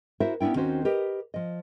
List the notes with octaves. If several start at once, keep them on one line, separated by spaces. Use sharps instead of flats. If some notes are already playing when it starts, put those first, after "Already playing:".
E4 F#4 A#4 C5 E5
B3 C#4 D4 E4 G5
D#2 D#3 C4 C#4 F#4 C5
G4 A#4 B4 D#5
F3 D#5